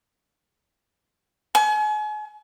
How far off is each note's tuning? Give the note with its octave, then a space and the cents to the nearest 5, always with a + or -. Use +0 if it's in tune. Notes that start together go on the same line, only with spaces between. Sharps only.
G#5 +40